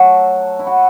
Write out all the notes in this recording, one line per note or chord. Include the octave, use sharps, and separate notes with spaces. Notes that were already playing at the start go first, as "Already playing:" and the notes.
Already playing: F#3 A3 F#4 A4
E4
F#4